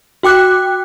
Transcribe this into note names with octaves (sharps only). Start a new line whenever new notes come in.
F#4 G5 D6 F#6